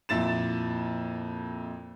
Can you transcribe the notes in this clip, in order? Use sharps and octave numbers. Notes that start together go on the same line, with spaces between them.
F2 A#2 E4 A6 E7